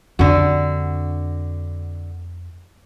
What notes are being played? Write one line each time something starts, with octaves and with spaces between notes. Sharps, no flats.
F2 D3 C4 F#4